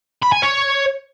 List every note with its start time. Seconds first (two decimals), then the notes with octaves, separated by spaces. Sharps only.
0.22 B5
0.32 G#5
0.42 C#5